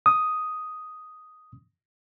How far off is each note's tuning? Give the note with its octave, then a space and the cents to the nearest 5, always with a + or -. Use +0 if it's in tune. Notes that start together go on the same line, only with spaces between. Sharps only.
D#6 +5